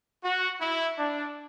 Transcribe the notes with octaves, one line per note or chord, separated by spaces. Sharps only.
F#4
E4
D4